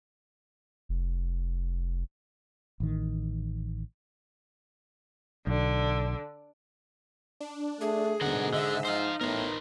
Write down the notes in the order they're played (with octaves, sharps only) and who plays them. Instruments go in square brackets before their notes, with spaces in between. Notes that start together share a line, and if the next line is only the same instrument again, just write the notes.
[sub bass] F1
[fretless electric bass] A1 D#3
[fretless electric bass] B1 [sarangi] D3
[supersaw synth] D4
[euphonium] A3 [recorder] G#4
[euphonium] G#2 [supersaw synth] B2 D3 [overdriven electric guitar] A#4 F#5
[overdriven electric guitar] D3 [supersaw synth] D#5 E5 E6
[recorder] D#4 [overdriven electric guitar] C5 F5
[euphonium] A2 [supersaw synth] B3 [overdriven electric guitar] A#4 C5